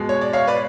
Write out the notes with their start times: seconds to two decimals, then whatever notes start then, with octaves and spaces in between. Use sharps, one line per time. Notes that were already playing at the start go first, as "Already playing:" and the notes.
Already playing: B2 G#3
0.09 C#5
0.21 D5
0.33 C#5 F5
0.47 B4 D5